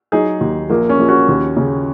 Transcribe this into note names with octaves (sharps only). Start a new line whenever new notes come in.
F#3 D#4 G#4
D#2
A#1 A#3
C#4
A#1
C#4 F#4
D#2
C#3